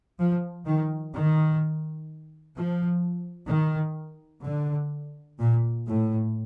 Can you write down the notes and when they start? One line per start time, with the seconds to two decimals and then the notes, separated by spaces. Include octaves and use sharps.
0.19 F3
0.66 D#3
1.13 D#3
2.56 F3
3.50 D#3
4.44 D3
5.39 A#2
5.86 A2